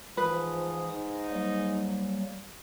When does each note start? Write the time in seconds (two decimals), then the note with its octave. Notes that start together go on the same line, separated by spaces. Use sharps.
0.17 G#2 E3 F3 B4 D#6
0.93 D#4
1.31 F#3 G3 A#3